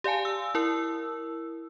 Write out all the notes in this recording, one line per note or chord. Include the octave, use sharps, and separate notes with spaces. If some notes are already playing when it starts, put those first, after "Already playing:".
G4 D5 F5 G#5 A5
E6
E4 A#4 E6